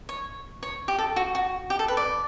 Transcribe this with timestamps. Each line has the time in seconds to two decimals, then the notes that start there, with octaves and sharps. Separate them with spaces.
0.09 C#5
0.63 C#5
0.88 G4
0.99 A4
1.16 F#4
1.35 F#4
1.70 G4
1.79 A4
1.88 B4
1.97 D5